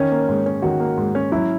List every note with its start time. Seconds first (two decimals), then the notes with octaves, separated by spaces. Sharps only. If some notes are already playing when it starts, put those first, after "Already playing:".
Already playing: D#3 C#4
0.11 A#3
0.29 G#2
0.46 C#4
0.62 D#3 F#4
0.80 A#3
0.97 G#2
1.15 C#4
1.32 F#3 E4